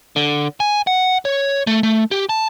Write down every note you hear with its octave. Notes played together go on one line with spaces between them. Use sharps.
D3
G#5
F#5
C#5
A3
A3
G4
A5